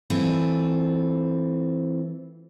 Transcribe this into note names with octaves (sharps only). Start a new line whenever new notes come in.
E3 A3 C4 F4